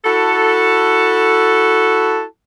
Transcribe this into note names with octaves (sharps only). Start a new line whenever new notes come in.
E4 F#4 A4